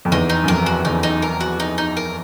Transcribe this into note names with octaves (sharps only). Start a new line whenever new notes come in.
F2
E2 D#4
D#4
F#2
F2 A#4
F#4
E2 D#4
D#4
A#4
F#4
D#4
D#4
A#4